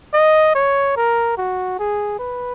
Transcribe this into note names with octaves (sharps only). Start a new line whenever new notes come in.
D#5
C#5
A#4
F#4
G#4
B4